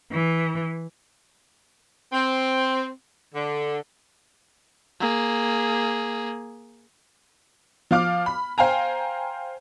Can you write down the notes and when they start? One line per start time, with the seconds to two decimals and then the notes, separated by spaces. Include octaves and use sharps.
0.11 E3
2.13 C4
3.35 D3
5.00 A#3 G#4
7.91 F3 F5 D6 F6
8.26 B5
8.58 C5 F5 G5 G#5 A#5